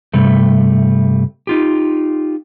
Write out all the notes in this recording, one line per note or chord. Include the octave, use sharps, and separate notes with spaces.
G2 C3 G3 A3
D#4 F4 G4